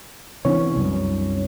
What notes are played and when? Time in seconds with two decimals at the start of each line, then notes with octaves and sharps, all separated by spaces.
0.45 C3 E3 B3 C#4 D4 C#5
0.76 C2 F#2